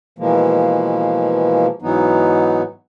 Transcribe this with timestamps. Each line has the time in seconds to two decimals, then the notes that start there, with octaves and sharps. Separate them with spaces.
0.19 B2 E3 F3 G#3 A#3
1.82 G#2 E3 F#3 B3 D#4